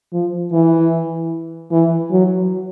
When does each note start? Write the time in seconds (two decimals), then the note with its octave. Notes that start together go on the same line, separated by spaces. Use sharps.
0.13 F3
0.53 E3
1.71 E3
2.11 F#3